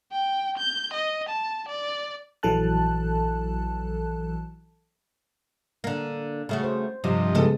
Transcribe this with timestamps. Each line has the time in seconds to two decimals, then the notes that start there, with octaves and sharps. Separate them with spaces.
0.12 G5
0.58 G6
0.93 D#5
1.29 A5
1.69 D5
2.43 A#1 E3 F#3 A4 A5 F#6
5.84 D3 A#3
6.49 C#3 A3 F#4
6.64 C5
7.04 G2 C3 F3 D#5
7.35 E2 C#3 G#3 B3 A4